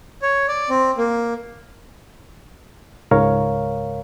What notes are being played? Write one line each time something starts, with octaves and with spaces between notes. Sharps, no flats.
C#5
D5
C4
A#3
C#2 G#2 A#4 C#5 F5